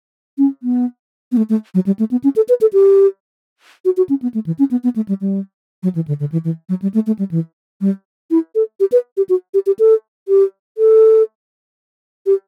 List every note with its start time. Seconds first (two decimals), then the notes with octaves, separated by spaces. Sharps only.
0.38 C#4
0.63 B3
1.32 B3
1.37 A3
1.50 A3
1.75 F#3
1.86 G3
1.99 A3
2.11 B3
2.24 C#4
2.36 A4
2.49 B4
2.61 A4
2.73 G4
3.85 F#4
3.97 F#4
4.09 C#4
4.22 B3
4.34 A3
4.46 E3
4.59 C#4
4.71 B3
4.84 B3
4.96 A3
5.08 G3
5.21 G3
5.83 F#3
5.95 E3
6.08 D3
6.20 D3
6.32 E3
6.45 E3
6.69 F#3
6.82 G3
6.94 A3
7.07 A3
7.19 G3
7.31 E3
7.81 G3
8.31 E4
8.55 A4
8.80 G4
8.92 B4
9.17 G4
9.29 F#4
9.54 G4
9.66 G4
9.79 A4
10.28 G4
10.78 A4
12.26 G4